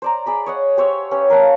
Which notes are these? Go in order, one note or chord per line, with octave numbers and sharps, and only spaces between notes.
C5 D5 A#5
G#4 D5 B5
C#5 D#5 F#5
G4 C5 C#5 E5
C#4 G4 B4
A#4 F5 F#5 A5